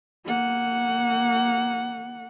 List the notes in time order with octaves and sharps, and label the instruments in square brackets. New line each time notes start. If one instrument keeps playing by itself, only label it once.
[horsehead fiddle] A#3 F#5